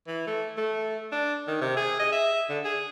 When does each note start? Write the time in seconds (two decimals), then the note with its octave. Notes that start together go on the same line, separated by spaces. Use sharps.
0.07 E3
0.27 A3
0.57 A3
1.12 D4
1.47 D#3
1.61 C3
1.77 G#4
1.99 D#5
2.12 E5
2.49 D3
2.65 G#4